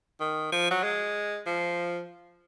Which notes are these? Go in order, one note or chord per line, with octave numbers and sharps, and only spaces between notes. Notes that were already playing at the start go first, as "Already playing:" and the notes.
D#3
F3
F#3
G#3
F3